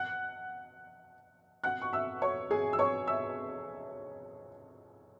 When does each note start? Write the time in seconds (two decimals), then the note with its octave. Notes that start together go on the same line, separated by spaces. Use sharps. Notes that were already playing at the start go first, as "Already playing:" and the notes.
Already playing: F#5 F#6
1.64 F#5 F#6
1.82 C#6
1.93 E5 E6
2.22 C#5 C#6
2.51 G#4 G#5
2.73 E6
2.79 C#5 C#6
3.07 E5 E6